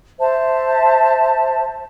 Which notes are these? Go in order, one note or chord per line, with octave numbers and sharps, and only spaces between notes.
C5 E5 A5